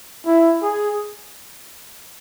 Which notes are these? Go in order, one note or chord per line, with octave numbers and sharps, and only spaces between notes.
E4
G#4